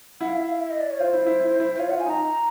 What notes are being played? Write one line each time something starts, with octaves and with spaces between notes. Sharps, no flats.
E4 F#5
F5
E5
F5
E5
D#5
D5
C#5
F4 C5
E4
E4
E4
E4
C5
F4 C#5
F4 F#5
G#5
D#4 A#5